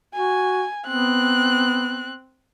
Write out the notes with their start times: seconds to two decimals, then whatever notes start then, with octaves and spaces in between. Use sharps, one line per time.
0.15 F#4 G#5
0.87 B3 C4 F#6